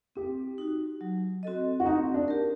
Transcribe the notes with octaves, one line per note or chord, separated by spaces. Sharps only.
C4 G4
D#4 F#4
F#3
C4 F#4 A4 D#5
F#4
C4 D#4
D4
G4 A#4